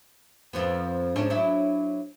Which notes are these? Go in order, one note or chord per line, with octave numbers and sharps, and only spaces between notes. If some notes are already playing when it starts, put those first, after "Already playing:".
F2 F3 B3
G#2 C#4 D4
F#3 D4 E4